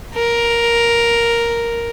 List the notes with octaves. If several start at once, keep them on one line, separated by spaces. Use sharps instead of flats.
A#4